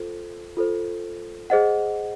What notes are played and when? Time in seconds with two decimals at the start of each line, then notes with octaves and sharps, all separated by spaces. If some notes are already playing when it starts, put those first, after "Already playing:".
Already playing: F4 A4 C5
0.57 F4 A4 C5
1.50 G#4 C5 D#5 F#5